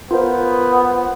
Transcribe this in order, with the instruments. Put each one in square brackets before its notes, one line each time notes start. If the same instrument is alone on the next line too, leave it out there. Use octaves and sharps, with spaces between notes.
[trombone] B3 [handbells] F4 A#4 C5